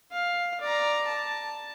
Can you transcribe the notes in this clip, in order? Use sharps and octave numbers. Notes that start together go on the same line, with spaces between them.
F5
D5 A#5
A5